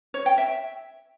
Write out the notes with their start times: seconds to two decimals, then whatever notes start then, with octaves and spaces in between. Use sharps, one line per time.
0.14 C#5
0.26 G5
0.38 E5